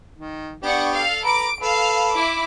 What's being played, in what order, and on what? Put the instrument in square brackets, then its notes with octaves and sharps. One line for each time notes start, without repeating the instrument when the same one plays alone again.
[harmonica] D#3
[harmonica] B3 G4 [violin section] D4 F#5 C#6
[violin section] A4 F5
[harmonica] B4 A#5 [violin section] D6 D7
[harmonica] A4 B4 [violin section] F5
[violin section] E4 D6